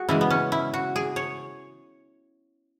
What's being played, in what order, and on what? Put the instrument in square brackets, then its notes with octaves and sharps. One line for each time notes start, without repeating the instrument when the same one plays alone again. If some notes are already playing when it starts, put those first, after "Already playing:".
Already playing: [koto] F#4 G#4
C#3 E3 G#3 E4
B3
C#4
E4
F#4
G#4
C#5